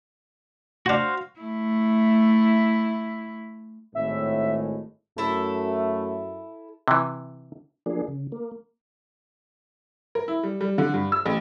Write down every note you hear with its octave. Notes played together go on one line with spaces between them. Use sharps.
D4 F#4 C5 F5 F#5
A3 E4
G#1 A2 G#3 E5
F#2 A3 E4 A4
C3 E3
F3 A#3 D4 G#4
C#3
A#3
A#4
E4
G3
G3
D3
G2
E6
A1